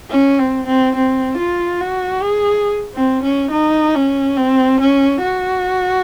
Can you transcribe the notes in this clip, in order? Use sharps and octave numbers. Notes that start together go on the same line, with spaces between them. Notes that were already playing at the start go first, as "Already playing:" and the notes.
C#4
C4
C4
C4
F4
F#4
G#4
C4
C#4
D#4
C#4
C4
C#4
F#4